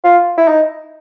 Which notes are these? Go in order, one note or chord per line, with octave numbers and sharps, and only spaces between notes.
F4
E4
D#4